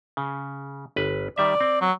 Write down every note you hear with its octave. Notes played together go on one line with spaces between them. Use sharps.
C#3
G1 B4
D#3 G3 D5 E5
C4
F#3